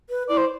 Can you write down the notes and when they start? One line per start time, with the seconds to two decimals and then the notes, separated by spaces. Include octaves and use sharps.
0.10 B4
0.29 E4 D5
0.37 C5